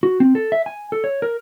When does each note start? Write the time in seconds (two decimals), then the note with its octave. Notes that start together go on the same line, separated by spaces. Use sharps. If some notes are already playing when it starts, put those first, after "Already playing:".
0.03 F#4
0.20 C4
0.35 A4
0.52 E5
0.66 G#5
0.92 A4
1.04 C#5
1.22 A#4